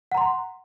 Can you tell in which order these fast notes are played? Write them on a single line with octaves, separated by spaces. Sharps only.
F#5 A#5 C6